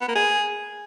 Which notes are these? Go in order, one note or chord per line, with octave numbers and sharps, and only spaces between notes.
B3
A#3
G#4